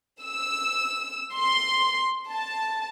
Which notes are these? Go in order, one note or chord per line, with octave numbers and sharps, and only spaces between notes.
E6
C6
A5